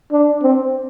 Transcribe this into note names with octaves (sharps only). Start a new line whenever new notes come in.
D4
C4